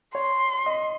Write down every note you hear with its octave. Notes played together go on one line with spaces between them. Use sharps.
C#5 C6
D#5